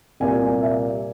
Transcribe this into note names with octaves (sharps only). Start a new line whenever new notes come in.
C2 A#2 G3 A#3 G#5
E5